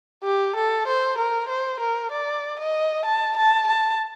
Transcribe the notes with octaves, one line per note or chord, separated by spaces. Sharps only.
G4
A4
C5
A#4
C5
A#4
D5
D#5
A5
A5
A5